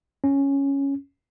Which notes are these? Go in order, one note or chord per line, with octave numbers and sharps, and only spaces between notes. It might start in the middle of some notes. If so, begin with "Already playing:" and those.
C#4